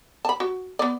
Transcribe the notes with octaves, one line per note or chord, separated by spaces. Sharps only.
A5 B5
F#4
B3 D5